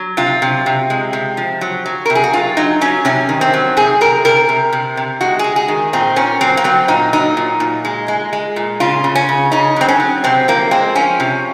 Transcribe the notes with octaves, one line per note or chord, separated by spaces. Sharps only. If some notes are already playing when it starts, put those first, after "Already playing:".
Already playing: F#3
C3 F4
C3
C3
G#3
C3
F3
F#3
F#3
A#4
C3
G#4
F#4
F#3 F4
F#3 D#4
F#3 C#4
C3 C#4
D#3
C4
F#3
C3 G#4
C3 A#4
C3 A#4
C3
C3
C3
G#3 F#4
G#3 G#4
G#4
D#3
A#2 C4
A#2 C#4
F#3 C4
A#3
F#3 C4
A#2 D#4
F#3 D#4
A#2
A#2
G#3
G#3
G#3
A#2
C#3 F4
C#3
C#4
C#3
C#3 D#4
F#3 C4
C#4
F#3
C3 C4
F3 A#3
G#3 C4
F3 C#4
C3